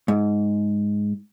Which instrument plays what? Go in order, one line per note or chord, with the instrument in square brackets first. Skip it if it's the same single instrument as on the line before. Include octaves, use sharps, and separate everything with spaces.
[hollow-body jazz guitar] G#2